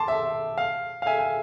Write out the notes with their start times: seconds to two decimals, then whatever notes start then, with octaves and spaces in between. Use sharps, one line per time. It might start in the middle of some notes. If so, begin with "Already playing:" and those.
Already playing: A5 C6 D6
0.08 E5
0.58 F5
1.02 F5
1.06 E5 G#5
1.19 G#5